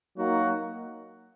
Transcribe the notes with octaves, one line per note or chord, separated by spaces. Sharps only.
F#3 A#3 D#4 F#4